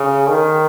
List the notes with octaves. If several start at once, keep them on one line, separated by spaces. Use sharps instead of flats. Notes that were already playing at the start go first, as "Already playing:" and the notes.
Already playing: C#3
D#3